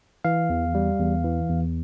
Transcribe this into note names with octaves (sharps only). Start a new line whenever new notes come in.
E3 F5
E2
G3
E2
E3
E2